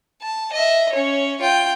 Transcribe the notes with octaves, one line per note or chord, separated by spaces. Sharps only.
A5
D#5 E5
C#4 C#5
F4 G5